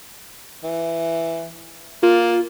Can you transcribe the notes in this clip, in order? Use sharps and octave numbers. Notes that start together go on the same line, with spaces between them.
E3
A#3 F4